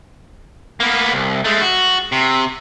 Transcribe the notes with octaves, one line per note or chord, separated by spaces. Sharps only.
A#3 B3
C2
G#3 A3
F#4
C3